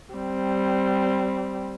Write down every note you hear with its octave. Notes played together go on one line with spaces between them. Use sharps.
G3 C4